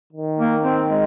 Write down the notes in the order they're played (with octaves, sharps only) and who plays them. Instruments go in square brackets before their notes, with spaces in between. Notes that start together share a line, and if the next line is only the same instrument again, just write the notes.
[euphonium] D#3
[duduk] A#3
C4
G#3